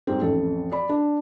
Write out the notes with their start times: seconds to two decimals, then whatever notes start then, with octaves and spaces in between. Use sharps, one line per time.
0.07 G#2 G3 C4
0.21 A1 F2 A4
0.72 D5 B5
0.89 D4